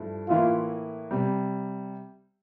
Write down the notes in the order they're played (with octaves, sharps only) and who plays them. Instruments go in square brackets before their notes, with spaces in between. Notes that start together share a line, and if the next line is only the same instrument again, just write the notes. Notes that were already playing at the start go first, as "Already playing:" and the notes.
Already playing: [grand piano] G2 F3 A3 E4
[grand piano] A2 E3 A#3 E4 [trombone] F4
[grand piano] C3 G3